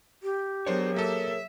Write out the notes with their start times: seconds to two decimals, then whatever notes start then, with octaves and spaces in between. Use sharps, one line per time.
0.23 G4
0.66 F#3 B3 D4 G#4 A#4 C5 C#5
0.96 A#3 A4 E5